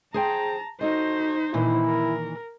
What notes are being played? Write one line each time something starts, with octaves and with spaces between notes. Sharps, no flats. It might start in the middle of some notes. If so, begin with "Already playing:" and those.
G#4 C5 G5 A5 A#5
D#4 F#4 A4 C5 D#5
A#2 D#3 E3 E4
A#4